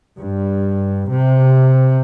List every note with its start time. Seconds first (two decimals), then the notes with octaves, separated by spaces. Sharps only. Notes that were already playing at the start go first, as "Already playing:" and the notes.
0.18 G2
1.09 C3